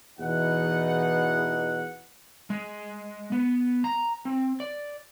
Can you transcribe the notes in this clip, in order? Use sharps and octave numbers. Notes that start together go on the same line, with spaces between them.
E2 B2 E3 D#4 F#5
G#3
B3
A#5
C4
D5